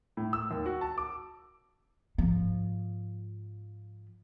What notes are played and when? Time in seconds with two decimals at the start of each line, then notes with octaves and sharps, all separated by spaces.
0.17 A2
0.33 E6
0.51 D#2
0.66 F#4
0.81 A5
0.98 D6
2.18 G#2 F3